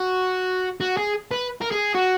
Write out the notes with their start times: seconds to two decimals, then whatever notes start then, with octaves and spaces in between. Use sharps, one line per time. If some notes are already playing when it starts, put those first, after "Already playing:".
Already playing: F#4
0.80 F#4
0.97 G#4
1.31 B4
1.61 A#4
1.71 G#4
1.94 F#4